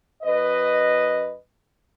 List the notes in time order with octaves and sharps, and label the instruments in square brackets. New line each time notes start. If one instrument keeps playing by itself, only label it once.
[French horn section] F#2 B4 D#5